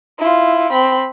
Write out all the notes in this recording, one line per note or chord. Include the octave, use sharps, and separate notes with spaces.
E4 F4
C4 B5